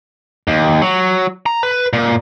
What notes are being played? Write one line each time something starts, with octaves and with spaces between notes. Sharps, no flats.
D#2
F#3
A#5
B4
A#2